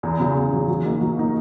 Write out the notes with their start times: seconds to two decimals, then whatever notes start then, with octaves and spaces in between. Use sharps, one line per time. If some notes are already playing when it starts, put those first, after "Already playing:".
0.03 E2
0.19 C#3 F#3
0.36 E2
0.52 C#3 F#3
0.68 F#3
0.85 A#3 D#4
1.01 F#3
1.18 A#3 D#4